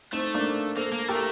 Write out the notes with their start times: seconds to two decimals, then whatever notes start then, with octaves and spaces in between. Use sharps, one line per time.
0.13 A3 C4 D#4
0.34 A#3 D4
0.77 A#3 A4 C5
0.92 A#3
1.08 A3 G4 A#4